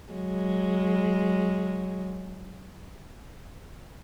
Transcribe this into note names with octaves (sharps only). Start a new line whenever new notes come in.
F#3 G#3